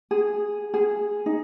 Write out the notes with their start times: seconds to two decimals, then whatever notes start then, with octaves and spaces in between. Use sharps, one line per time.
0.11 G#4
0.74 G#4
1.26 D#4